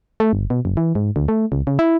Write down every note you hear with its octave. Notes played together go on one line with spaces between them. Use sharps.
A3
G1
B2
F#1
E3
G#2
D2
A3
C#2
C#3
E4